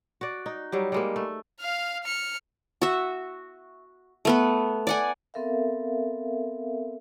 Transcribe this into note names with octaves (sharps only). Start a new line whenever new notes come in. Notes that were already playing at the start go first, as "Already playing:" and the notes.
F#4 D5
D#4
F#3 G3 G4
G3 G#3 A#3
A3
F5 F6
F6 C#7
F#4 E5
A3 B3 B4
D5 F#5 G#5
B3 C4 A4 A#4 E5 F5